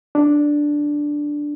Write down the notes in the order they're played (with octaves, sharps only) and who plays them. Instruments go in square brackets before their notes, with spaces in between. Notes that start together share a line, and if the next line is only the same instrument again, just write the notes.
[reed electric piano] D4